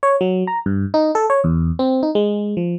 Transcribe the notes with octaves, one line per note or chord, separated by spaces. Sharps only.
C#5
F#3
A#5
G2
D#4
A4
C#5
E2
C4
D#4
G#3
F3